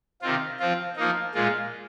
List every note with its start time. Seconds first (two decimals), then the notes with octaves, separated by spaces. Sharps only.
0.22 C3 D#3 C4 F4
0.60 F3 C4 F4
0.97 F3 A#3 D#4
1.34 A#2 G#3 F4